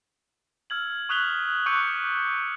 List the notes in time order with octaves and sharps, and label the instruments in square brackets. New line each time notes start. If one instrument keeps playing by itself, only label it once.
[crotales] E6 F6 G#6 F#7
C#6 D#6 F#6 B6 F7 G7
C#6 D6 E6 F#6 G6 C#7